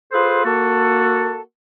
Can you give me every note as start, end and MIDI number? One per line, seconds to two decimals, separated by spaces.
0.12 0.42 65
0.12 0.42 68
0.12 0.42 69
0.12 0.42 71
0.12 0.42 72
0.45 1.40 58
0.45 1.40 66
0.45 1.40 69